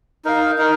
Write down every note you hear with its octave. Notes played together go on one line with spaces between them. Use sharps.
D#4 A#4 F5
D#4 A#4